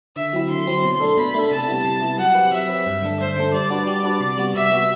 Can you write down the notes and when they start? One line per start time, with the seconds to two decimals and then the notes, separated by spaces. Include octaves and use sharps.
0.16 D3 E5
0.33 F#3 C4 E4
0.49 D3 C6
0.67 F#3 C4 E4
0.83 B2
1.00 A3 D4 A4
1.17 B2 B5
1.34 A3 D4 A4
1.51 C3 A5
1.67 G3 B3 E4
1.84 C3
2.02 G3 B3 E4
2.18 F#3 F#5
2.35 C4 G4 B4
2.52 F#3 E5
2.69 C4 G4 B4
2.86 G2
3.02 D3 A3 D4 A4
3.20 G2 C5
3.36 D3 A3 D4 A4
3.53 G3 D5
3.70 D4 F#4 B4
3.87 G3
4.03 D4 F#4 B4
4.20 C3
4.37 G3 B3 F#4
4.54 C3 E5
4.71 G3 B3 F#4